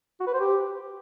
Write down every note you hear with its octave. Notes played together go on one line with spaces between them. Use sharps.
F#4
B4
C5
G4